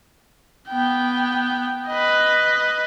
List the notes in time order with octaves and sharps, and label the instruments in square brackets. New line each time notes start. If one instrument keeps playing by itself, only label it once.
[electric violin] B3 G5
B4 D#5